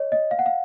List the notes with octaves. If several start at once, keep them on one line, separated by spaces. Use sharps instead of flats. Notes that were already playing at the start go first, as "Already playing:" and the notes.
Already playing: C#5 D#5
D#5
F5
F#5
F5